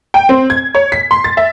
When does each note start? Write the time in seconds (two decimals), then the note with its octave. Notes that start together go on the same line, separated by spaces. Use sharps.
0.14 G5
0.29 C4
0.50 G#6
0.75 C#5
0.92 B6
1.11 C6
1.24 A6
1.37 E5